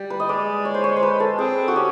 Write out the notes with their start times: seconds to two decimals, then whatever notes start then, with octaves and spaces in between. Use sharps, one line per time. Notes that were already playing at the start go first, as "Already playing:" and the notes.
Already playing: G3
0.10 B4
0.20 D#5
0.29 G#3 D5
0.65 C#5
0.74 C5
0.84 C#5
0.97 C5
1.03 B4
1.20 A4
1.38 C4 G#4
1.68 F#4
1.76 C#4 G4